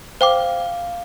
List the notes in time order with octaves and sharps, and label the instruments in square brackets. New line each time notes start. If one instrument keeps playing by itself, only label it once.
[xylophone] C5 G5 D6 [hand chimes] F5